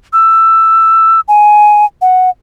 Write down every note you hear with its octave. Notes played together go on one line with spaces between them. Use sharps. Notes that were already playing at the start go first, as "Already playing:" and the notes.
E6
G#5
F#5